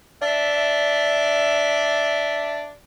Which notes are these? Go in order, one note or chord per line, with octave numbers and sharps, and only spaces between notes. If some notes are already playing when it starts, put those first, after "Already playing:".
D4 D5 E5